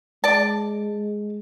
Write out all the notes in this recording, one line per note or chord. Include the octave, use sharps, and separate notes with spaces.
G#3 D5 A5